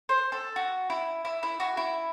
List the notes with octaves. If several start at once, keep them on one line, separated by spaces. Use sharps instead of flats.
C5
A4
F#4
E4
E4
E4
F#4
E4